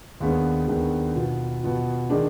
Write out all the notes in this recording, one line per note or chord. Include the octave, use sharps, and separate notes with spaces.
D#2 D#3 G#3 B3 D4
D#2 D#3 G#3 B3 D4
B2 B3 F4
B2 B3 F4
D#3 G#3 D4